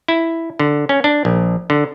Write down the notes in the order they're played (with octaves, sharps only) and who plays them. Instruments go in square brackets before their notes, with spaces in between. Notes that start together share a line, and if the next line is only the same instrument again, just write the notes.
[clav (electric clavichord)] E4
D3
C#4
D4
A#1
D3